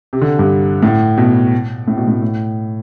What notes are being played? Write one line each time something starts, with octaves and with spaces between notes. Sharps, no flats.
C3
D3
G2
A2
B2
A2
B2
A2
A2